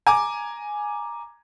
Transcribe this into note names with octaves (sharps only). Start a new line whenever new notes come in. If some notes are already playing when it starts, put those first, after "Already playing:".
G#5 A#5 D6